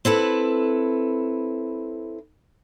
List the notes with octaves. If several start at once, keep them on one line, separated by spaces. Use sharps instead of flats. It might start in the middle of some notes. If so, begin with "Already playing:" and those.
C4 E4 A4 B4